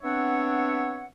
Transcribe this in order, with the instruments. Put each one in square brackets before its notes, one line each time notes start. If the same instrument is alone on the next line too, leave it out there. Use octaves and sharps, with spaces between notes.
[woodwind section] B3 C4 D4 C#5 E5 F#5